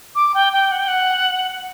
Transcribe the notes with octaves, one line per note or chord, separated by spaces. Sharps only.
D6
G5
G5
F#5
G5
F#5